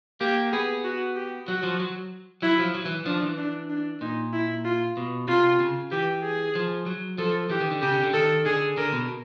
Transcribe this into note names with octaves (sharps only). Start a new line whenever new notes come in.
A#3 G4
B3 G#4
F#4
G4
F#3 F#4
F3
F#3
F#3 E4
F3
F#3
E3
F3 D4
E3
D4
D4
A#2 D#4
E4
F4
B2
C3 F4
C#3
E3 G4
G#4
F3
F#3
F3 A4
E3 G4
D#3
D3
C#3 G4
D3
D3
D#3 A4
D3 G#4
D3 A#4
B2